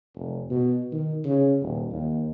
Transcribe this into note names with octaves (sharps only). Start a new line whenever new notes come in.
F1
B2
D#3
C#3
D#1
D#2